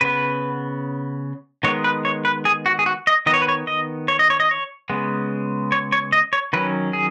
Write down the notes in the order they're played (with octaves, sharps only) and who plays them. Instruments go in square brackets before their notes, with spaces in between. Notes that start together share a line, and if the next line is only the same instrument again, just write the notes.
[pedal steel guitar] C#3 B3 B4
D#3 G#3 B3 C#5
B4
C#5
B4
G#4
F#4
G#4
F#4
D#5
D#3 B3 D#5
C#5
B4
C#5
D#5
C#5
D#5
C#5
D#5
C#5
C#3 G#3 B3
C#5
C#5
D#5
C#5
D#3 F#3 C#4 B4
G#4